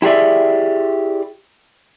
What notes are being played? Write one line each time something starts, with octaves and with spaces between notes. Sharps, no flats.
E4 G4 G#4 D5 E5